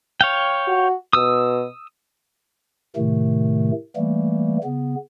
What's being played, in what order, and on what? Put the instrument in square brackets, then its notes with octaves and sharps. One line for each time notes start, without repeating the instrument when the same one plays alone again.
[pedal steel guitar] C#5 F5 G5
[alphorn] F#4
[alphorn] B2 [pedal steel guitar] D#6 E6
[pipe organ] A2 C3 D#3 A3
E3 G3 A3 A#3
C#3 B3